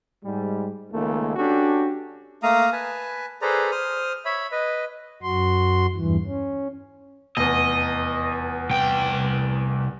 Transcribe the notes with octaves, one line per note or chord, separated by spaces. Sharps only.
G#2 G3
C#2 D#3 A3 A#3
C#4 D4 F#4 G4 A4
A3 A#3 F5 A#5 D#6
B4 G#5 A5
G#4 A4 B4 C5 D5 A#5
C5 D#6 F6
C#5 E5 B5
B4 D#5
F#2 F#4 C6
E2 G2 E3
C#4
F1 E2 D#5
C2 G5